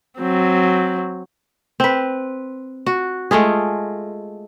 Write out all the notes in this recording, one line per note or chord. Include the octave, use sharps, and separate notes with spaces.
F#3 C4
C4 B4
F#4
G#3 A3 F4 G#4